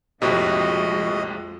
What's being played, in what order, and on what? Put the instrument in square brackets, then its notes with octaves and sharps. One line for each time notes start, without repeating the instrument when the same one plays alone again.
[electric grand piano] A#1 A2 C3 [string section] F2 F3 G#3 [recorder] F#4 [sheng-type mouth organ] D#5